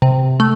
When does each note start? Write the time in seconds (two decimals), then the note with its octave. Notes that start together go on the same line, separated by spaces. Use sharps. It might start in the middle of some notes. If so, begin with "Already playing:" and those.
0.02 C3
0.40 A3